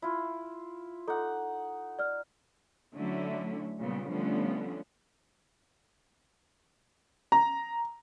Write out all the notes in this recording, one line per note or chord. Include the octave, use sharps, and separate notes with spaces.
E4 F4
D#4 A4 F#5
D5 F6
D3 F#3 A3 C#4 E4
A#2 C#3 G3 B3
D3 F3 G3 A3 B3 C#4
A#5